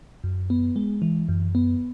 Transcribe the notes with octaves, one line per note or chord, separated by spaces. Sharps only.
F#2
B3
G#3
E3
F#2
B3